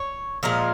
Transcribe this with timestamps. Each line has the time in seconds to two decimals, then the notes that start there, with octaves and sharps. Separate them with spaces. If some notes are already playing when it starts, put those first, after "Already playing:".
Already playing: C#5
0.43 A#2 F3 G#3 A#4